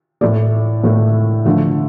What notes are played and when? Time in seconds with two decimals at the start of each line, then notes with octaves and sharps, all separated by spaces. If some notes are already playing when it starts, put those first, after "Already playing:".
0.21 A2 A3 D5
0.84 A2 A3
1.45 D3 F3 A3